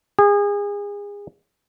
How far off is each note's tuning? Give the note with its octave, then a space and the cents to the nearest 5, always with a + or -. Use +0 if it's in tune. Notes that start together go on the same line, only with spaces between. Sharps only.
G#4 -30